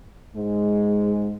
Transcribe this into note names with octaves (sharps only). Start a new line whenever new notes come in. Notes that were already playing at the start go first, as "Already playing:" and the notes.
G#2 G#3